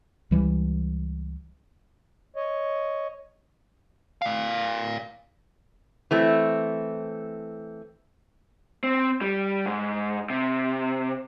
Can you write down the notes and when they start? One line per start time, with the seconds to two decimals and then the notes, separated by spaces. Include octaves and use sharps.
0.31 C#2 E3 G3
2.36 C#5 D#5
4.22 D5 F5
6.11 E3 A3 C4
8.84 C4
9.21 G3
9.66 G#2
10.30 C3